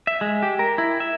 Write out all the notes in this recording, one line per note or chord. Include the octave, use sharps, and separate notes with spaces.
E5
G#3
G4
A#4
E4
E5